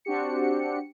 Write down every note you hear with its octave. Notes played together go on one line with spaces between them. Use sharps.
C4 D4 F#4 G4 C#7